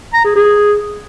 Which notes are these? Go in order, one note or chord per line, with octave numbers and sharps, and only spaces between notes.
A#5
G#4
G#4